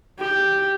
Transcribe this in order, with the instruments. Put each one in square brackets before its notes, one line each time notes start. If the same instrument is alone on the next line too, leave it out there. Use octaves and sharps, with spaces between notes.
[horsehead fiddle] G4